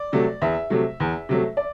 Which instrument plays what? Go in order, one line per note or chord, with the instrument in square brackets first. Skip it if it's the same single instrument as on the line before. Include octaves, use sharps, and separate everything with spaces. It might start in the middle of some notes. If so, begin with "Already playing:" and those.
Already playing: [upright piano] D5
C3 F#3 A3
E2 E5
C3 F#3 A3
E2
C3 F#3 A3
D5